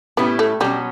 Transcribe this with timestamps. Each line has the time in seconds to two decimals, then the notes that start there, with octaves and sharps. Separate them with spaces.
0.17 A2 G3 B3 C#4 E4 G4
0.39 A3
0.60 B2 F#3 G3 C#4